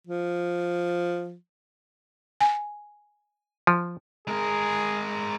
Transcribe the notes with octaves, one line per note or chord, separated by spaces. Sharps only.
F3
G#5
F3
G#3 G#4 A#4